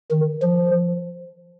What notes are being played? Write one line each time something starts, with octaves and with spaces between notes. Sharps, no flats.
D#3
F3